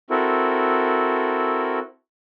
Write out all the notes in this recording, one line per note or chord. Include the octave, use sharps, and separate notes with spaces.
C4 E4 F#4 A4 A#4